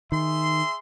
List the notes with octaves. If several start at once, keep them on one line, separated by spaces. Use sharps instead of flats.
D#3 G#4 E5 C6